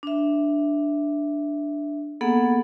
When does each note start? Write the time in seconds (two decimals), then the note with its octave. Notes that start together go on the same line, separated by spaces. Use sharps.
0.03 D4 E5
2.21 A#3 B3 G#4 A4 F#5